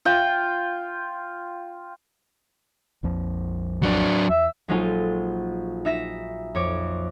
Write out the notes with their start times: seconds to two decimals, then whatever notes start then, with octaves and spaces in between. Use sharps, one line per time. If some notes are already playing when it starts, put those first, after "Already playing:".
0.05 F4 G5
3.03 A#1 F2 F3
3.83 F#3 D4
4.29 E2 E5
4.68 A#1 F#3 G#3 D#4 F4 A4
5.85 D#4 E5 A#6 E7
6.55 F2 C#5 D6